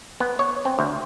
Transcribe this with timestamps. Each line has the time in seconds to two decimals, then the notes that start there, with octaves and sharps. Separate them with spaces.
0.20 B3
0.39 C#5
0.65 C4
0.79 D2